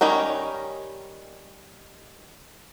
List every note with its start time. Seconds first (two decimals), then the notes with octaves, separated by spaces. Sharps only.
0.01 D#3 G3 C#4 D#4 A#4